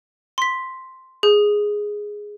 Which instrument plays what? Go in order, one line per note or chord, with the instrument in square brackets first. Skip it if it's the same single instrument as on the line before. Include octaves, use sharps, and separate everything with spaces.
[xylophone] C6 B6
G#4